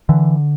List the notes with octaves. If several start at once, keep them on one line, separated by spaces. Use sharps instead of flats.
D3 E3